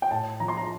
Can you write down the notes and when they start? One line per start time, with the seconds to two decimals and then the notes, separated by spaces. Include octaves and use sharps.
0.02 G5
0.11 A2 A5
0.40 F3 A#5
0.48 C6
0.57 A#5